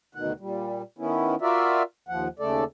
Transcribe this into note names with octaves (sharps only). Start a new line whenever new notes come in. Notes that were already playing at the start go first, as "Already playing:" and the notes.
D2 B2 D#3 F#5
A#2 G3
D#3 B3 C#4 E4
F4 F#4 A#4 D5 E5
D#2 F3 F#5
D#2 C#3 A3 A4 D5